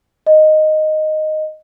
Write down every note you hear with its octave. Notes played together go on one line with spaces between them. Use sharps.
D#5